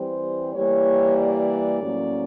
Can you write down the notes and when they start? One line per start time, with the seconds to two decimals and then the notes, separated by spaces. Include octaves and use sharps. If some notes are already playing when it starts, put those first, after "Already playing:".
Already playing: E3 G3 C4 C5
0.55 E3 G3 A#3 C#5
1.18 D5
1.81 A2 F#3 A#3 C#4